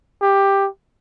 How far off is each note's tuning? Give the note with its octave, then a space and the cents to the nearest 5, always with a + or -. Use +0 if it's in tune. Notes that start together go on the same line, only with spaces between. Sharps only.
G4 +10